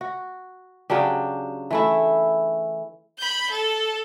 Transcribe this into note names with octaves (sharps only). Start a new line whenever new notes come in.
F#4
C#3 F#3 D4 G4
E3 A3 E4
B5 G6
A4